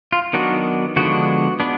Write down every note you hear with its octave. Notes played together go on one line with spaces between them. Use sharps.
F4
D#3 F#3 B3 D4 F#4
D3 F3 G#3 B3 D4 F#4
G#3 B3 D4